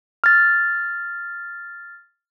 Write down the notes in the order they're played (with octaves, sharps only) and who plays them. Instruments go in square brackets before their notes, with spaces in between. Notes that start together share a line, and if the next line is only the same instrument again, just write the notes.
[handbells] F6 A6